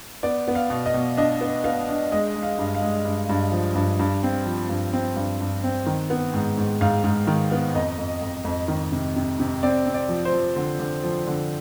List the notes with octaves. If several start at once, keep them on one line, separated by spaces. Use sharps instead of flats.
B3 D5
B3
F5
B2
D#5
B2
D4 D#5
B3
B3 F5
D4
G#3 D#5
G#3
F5
G2
F5
G#3
G2
G2
F3
G2
G2
C4
F3
G2
C4
G2
G2
C4
D#3
B3
G#2
G#2
G#2 F5
G#2
D#3
B3
F2 D#5
F2
F2
F2
D#3
C3
C3
C3
C4 D5
C4
D5
F3
C5
F3
D3
D3
F3
D3